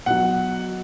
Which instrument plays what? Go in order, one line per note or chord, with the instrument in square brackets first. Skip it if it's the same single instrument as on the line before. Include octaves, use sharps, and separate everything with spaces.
[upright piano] B2 F#3 F#5